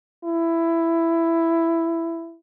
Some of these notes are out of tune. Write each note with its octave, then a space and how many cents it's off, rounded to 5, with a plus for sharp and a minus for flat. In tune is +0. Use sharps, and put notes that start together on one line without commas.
E4 +10